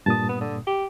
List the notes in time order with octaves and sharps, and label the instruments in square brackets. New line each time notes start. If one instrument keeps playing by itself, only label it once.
[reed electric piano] G2 A#2 D#6 [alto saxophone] A5
[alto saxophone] B3
D3
G4